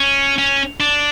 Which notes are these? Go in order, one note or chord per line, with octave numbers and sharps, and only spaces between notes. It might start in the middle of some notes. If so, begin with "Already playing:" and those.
Already playing: C#4
C#4
D4